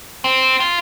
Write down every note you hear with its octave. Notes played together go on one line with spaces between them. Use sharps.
C4
F4